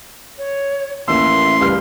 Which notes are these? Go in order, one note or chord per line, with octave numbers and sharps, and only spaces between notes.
C#5
A1 D#2 E5 C6 E6
C#2 G3 B4 F6